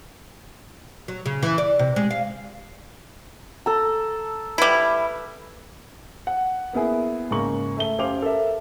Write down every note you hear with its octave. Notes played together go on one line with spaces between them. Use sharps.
F#3
C#3
E3
D5
C3
G#3
F5
A4 A#5
G3 E4 B4
F#5
A#3 B3 E4 G#4
G#2 C#3 A#3 A#5 C#6 F#7
A3 E5 G7
F#2 G4 C5 F5 D6 F7
A4 A#4 E5